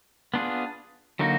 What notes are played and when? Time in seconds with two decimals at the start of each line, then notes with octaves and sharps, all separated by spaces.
0.34 B3 D4 F4 G#4
1.19 D3 F#3 A#3 D#4 F#4